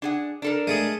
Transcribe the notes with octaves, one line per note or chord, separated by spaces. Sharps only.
D4 G#4 F#5
D4 A4 A#4
G#3 A3 G#4